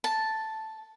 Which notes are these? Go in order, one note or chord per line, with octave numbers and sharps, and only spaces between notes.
A5